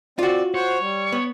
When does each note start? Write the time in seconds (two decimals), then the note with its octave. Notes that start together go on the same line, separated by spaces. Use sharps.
0.19 C4 F4 F#4 D5
0.54 C5 C#5 F#5
0.81 G3
1.12 B3